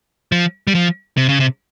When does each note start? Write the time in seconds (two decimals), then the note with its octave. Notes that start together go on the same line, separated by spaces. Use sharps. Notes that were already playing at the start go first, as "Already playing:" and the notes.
0.32 F3
0.67 G3
0.75 F3
1.17 C3
1.29 C#3
1.40 C3